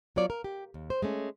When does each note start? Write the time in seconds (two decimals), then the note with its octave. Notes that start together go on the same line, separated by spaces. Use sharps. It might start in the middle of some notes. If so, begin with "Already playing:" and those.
0.16 F#3 B3 F4 C#5 D5
0.30 A#4
0.44 G4
0.74 D#2
0.90 C5
1.02 G#3 A3 C#4